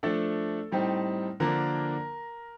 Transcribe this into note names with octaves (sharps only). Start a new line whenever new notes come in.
F3 A3 D4 A4
A2 G3 C4 D#4
D3 F3 A#3 D4 A#4